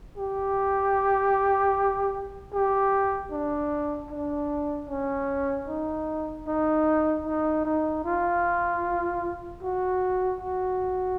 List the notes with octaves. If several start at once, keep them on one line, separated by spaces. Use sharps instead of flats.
G4
G4
D4
D4
C#4
D#4
D#4
D#4
D#4
F4
F#4
F#4